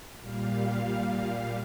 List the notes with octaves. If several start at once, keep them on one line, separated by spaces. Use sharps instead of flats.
A#2 G3 F5